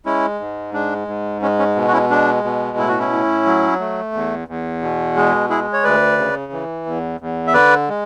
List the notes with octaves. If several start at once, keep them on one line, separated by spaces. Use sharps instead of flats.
G#3 C#4 E4
G#2
G#3 D4
G#2
G#3 C#4
C#4
B2
F#4
C#4 E4
G#3 D4
B2
A2 E4
F#4
C#4 E4
A2
F#3
A3
E2
E2
B2
G#3
G#3 E4 G#4
C#5
D2 B4 D5
C#3
E3
E2
E2
E5
D3 B4 D5
G#3